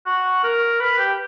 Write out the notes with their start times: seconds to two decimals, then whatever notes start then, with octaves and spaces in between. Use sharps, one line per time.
0.06 F#4
0.43 A#4
0.80 B4
0.98 G4